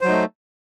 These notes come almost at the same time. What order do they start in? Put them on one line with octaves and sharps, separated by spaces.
C5 F#3 D#4 A3